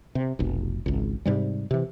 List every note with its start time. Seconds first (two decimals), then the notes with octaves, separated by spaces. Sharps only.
0.15 C3
0.39 F1 B1
0.86 G#1 C#2
1.26 G#2 C3 G3
1.71 C3 E3